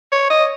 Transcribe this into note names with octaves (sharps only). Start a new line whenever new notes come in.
C#5
D#5